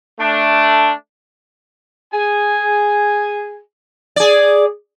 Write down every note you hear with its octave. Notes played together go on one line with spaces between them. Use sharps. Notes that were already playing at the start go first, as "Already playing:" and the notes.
A3 D4
G#4 G#5
G#4 D5